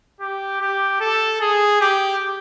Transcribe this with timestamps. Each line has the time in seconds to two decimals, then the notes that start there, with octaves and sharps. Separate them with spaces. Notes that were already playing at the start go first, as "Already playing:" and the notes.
0.21 G4
0.61 G4
1.00 A4
1.41 G#4
1.81 G4